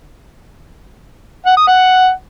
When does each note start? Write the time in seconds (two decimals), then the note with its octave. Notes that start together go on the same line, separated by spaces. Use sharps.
1.46 F#5
1.57 D#6
1.68 F#5